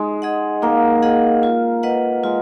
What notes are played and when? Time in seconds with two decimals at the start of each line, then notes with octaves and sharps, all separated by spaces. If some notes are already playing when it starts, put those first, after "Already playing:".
Already playing: G#3 D#4
0.22 G#4 D#5 F#5
0.62 A#3 D#4
1.03 G#4 D#5 F#5
1.43 F4
1.83 B4 D#5 F#5
2.23 G#3 F4